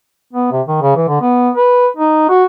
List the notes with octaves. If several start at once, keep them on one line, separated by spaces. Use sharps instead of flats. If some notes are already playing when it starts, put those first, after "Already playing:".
B3
C3
D#3
C#3
E3
D3
B3
B4
D#4
F#4